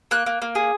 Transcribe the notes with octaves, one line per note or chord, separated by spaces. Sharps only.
A#3 F#6
A#3
A#3
G#4